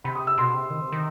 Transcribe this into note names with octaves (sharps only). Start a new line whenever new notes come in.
C3 B5
D#6
E6
B2 C6
C3
D#3
C3
D#3